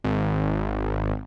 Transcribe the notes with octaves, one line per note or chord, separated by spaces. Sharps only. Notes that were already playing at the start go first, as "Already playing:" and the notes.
G#1